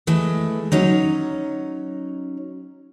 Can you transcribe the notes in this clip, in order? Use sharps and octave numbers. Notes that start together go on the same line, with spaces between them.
E3 G#3 A3
F#3 C#4 D#4